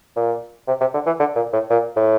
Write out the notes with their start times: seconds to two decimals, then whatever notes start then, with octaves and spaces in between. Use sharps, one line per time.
0.16 A#2
0.68 C3
0.81 C3
0.94 D3
1.06 E3
1.19 D3
1.36 A#2
1.53 A2
1.70 A#2
1.96 A2